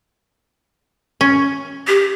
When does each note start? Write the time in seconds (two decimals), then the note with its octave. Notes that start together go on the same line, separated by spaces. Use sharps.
1.21 C#4
1.87 G4